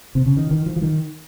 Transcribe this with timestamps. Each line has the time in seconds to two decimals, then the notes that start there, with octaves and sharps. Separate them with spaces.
0.15 C3
0.26 C#3
0.37 D#3
0.51 D#3
0.66 F3
0.76 F3
0.82 D#3